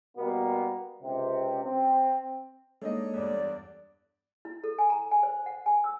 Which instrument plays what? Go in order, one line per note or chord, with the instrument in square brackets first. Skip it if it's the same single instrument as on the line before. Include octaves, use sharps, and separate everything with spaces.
[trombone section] B2 G3 A#3 B3
C#2 C3
C4
[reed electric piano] G#3 A#3 [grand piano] D4 D#4 D#5 [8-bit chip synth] A4 C#5
[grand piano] E2 G2 [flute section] D5
[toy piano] E4
A4
G#5
A#5
G#5
C5
F#5
G#5
E6